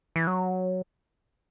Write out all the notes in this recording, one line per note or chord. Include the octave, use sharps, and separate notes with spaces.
E3
F#3